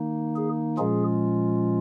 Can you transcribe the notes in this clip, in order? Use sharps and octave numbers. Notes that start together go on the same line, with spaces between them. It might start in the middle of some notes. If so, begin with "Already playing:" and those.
Already playing: D#3 A#3 D#4
G#4
A#2 F3 G#3 C#4 F4 G#4